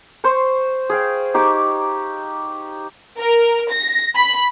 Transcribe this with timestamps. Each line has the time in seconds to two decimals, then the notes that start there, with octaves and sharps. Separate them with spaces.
0.24 C5 C6 C#6
0.90 G#4 F5 G5
1.34 D#4 G4 C#6 D6
3.18 A#4
3.71 A#6
4.15 B5